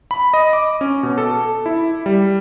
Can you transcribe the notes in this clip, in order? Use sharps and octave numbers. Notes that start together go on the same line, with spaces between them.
B5
D#5
D6
C#4
B2
A4
E4
G3